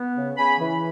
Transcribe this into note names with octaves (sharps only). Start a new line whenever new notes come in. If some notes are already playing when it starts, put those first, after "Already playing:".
Already playing: B3
C#3
C#3 G#5 B5
E3